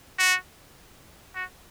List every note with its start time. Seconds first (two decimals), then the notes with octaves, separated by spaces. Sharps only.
0.18 F#4
1.35 F#4